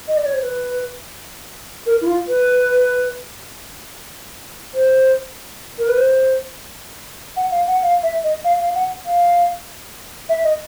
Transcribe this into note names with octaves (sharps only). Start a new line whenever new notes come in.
D#5
D5
C#5
C5
B4
A#4
E4
F4
B4
C5
A#4
B4
C5
F#5
F5
F#5
F5
E5
D#5
F5
F5
F#5
F5
E5
D#5